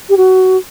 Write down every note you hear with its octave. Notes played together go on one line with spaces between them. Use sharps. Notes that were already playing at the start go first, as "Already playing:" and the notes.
G4
F#4